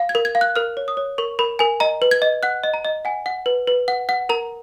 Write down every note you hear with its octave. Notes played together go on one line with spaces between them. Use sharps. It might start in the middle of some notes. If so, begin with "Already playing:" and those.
Already playing: F5
G#6
A#4
G#6
F5
F#6
A#4 F6
C#5
D#6
C#5
A#4 C#6
A#4 B5
A#4 G#5
D#5 A#5
B4
G#6
D#5
F#5 F#6
D#5
A#5
D#5
F#5 G#5
F#5
B4
B4
F#5
F#5
A#4 A#5